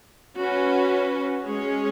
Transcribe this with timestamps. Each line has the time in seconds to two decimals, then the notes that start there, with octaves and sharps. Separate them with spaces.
0.36 C#4 F#4 B4
1.44 G#3 C#4 G#4 C#5